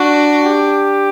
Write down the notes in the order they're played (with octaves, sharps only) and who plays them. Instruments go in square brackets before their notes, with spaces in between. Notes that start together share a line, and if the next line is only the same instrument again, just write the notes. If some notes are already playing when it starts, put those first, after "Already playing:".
Already playing: [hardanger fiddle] D4 [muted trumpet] F#4
[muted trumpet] G4